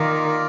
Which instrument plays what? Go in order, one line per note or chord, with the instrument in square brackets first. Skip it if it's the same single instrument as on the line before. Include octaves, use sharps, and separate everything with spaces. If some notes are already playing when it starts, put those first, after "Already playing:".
Already playing: [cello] D#3 [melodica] A#3 F4 A#4 D5